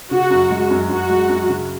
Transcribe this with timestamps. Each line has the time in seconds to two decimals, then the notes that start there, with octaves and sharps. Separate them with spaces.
0.11 C#3 F#4
0.30 F#2
0.51 G#3
0.70 F#2
0.90 F#2 F#4
1.10 G#3
1.29 F#2
1.49 C#3